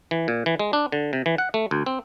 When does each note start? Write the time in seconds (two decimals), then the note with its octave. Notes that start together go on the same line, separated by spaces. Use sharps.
0.11 E3
0.28 A#2
0.46 E3
0.59 G#3
0.73 D4
0.92 D3
1.13 C3
1.26 E3
1.38 F#5
1.54 A3
1.71 D2
1.86 C4